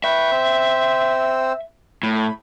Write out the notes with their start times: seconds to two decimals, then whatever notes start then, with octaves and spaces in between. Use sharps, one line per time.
0.04 B4 E5 G5 C#6
0.32 C4 C5 E6
2.03 A2 B5